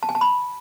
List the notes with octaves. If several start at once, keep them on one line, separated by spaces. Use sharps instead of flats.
A5
G#5
A5
B5